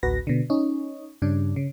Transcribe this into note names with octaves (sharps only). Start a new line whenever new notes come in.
A1 D2 F#4 B4 A#6
B2 D3
C#4 D#4
G2 C#3 D4
C#3